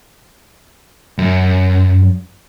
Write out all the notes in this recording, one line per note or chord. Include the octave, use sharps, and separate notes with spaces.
F#2